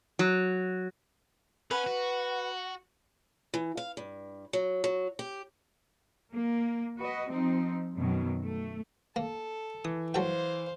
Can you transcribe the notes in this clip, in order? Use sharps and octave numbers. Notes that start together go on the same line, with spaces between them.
F#3
C#4 B4 F#5
F#4
E3
F5
G2
F#3
F#3
G4
A#3
F#4 B4 D#5
F3 C4 D#4
F#2 B2 D#3 F#3
A3
A#3 A4
E3 D#6
F#3 A4 C5 F5 G5